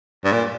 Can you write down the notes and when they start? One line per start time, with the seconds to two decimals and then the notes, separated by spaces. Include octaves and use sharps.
0.24 G2
0.32 A#2